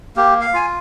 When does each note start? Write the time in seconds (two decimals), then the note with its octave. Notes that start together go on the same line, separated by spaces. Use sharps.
0.16 A#3 G4
0.41 F5
0.54 F4 G#5